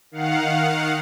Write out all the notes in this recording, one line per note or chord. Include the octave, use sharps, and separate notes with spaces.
D#3 F5 F#5